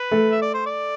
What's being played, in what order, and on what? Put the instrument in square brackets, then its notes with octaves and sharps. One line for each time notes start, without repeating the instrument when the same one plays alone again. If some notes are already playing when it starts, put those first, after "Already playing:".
Already playing: [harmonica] B4
[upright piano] A3
[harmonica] E5
D5
C5
D5